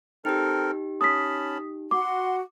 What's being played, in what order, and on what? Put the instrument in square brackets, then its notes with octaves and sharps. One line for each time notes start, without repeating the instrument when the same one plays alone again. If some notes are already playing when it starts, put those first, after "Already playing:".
[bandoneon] C4 A4 A#4 [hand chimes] D#4 G4
[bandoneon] C#4 A5 B5 [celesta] D#6 B6
[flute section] F#4 F#5 [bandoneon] C6 [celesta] D6